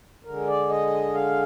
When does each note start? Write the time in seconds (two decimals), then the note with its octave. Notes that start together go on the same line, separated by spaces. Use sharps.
0.24 D3 G#3 A#4
0.47 D5
0.69 D#5
1.14 F5